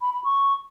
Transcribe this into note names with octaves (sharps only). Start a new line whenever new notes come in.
B5
B5
C#6